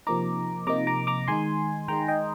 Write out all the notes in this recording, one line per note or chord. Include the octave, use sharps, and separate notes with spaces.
C3 F3 A#3 D#4 A#5 D6
C3 F3 A#3 D#4 A#5 D6
A#5 D6
A#5 D6
D#3 G#3 D#4 G#5 C6
D#3 G#3 D#4 G5 A#5
D#5 G5